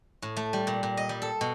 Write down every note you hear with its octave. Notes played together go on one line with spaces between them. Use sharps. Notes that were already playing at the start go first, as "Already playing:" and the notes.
A2
A3
G3
A#2
A#2
D#5
G3
A4
B2